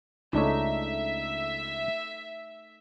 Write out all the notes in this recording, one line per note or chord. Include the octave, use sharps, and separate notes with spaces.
C#2 A3 D4 D#4 C#5 E5